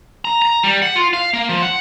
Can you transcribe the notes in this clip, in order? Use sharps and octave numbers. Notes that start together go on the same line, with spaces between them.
A#5
A#5
G3
F#5
F4
F5
A#3
F3
F#5